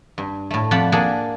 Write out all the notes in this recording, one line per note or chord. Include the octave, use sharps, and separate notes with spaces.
G2
A2 A3
F2 F3 D5 F#5 A5 B5
A#3 D4 G#4 A4 F#5